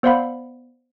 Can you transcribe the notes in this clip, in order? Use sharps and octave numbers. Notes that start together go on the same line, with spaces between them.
B3 C5 D5 F5 F#5 B5